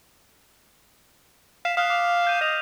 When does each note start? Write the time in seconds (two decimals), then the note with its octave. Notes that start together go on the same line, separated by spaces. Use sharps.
1.65 F5 B6 E7
1.77 F5 D#6 F6 F#6
1.90 D6
2.25 F6 G6 D#7
2.41 D#5 D#6 F7